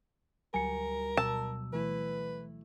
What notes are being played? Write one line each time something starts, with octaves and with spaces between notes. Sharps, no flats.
D2 F#3 G3 A#4 G#5 C#7
B2 F#3 A5 E6
E3 A3 E4 B4